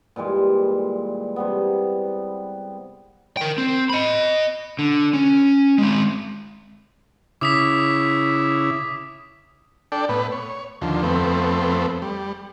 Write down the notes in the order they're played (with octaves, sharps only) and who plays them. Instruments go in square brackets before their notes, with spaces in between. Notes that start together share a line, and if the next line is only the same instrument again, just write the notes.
[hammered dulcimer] A#2 E3 G3 G#3
C3 G3 B3
[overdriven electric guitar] A#4 G5
C4
D#5 B5
D3
C#4
G#3 C4
[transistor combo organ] C#3 E4 [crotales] D6 D#6 B6
[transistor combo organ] D4 A4 D5 G5
A2 B3 B4
C#5
D#2 D3 F3
F2 A3 B3 C4
G3